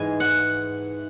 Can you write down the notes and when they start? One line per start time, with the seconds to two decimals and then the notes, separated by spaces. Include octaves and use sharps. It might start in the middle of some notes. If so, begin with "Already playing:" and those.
Already playing: G#2 E3 G#3 G#5
0.20 F#5